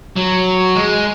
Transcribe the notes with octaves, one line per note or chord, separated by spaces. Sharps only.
F#3
G#3